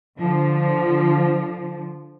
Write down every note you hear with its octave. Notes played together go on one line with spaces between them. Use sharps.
D3 F3